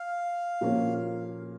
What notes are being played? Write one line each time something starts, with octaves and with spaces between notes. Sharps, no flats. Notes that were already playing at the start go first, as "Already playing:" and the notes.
Already playing: F5
A#2 F3 A#3 C#4